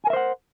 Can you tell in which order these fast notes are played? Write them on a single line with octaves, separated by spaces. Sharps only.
G#5 A#4 E5 C5 F#5